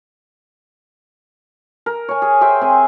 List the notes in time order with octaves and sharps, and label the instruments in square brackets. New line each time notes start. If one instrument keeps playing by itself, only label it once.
[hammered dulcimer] A#4
C#5 G#5
G#4
G#4 C5 E5 G5
C4 G#5